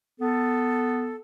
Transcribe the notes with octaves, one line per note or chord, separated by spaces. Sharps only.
B3 A4